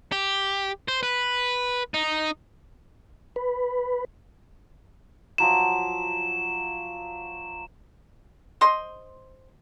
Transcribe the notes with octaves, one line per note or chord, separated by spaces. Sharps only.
G4
C5
B4
D#4
B4
F3 F#3 B5 E7
C5 D#5 C6